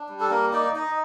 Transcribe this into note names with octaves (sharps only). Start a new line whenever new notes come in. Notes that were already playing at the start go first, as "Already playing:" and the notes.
Already playing: D4
G3
A4
A#3 A#4
D#4 D5
D#4 D#5